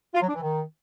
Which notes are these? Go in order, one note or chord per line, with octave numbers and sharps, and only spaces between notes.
F4
F#3
D4
E3
D#3